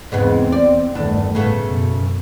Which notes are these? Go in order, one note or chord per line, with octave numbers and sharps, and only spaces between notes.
E2 G#2 C#3 B3 C4
D5
G1 E2 D#3 A3 D4
A2 C#3 A3 B3
F#2 B2